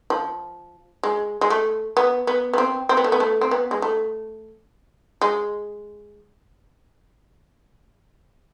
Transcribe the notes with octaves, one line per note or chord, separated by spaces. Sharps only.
F3
G#3
G#3
A3
B3
B3
B3
C4
C4
B3
A3
B3
A3
C4
B3
G#3
A3
G#3